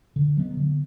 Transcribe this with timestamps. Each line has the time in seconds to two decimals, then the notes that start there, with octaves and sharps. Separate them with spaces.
0.16 D3
0.37 F#3 B3
0.57 D3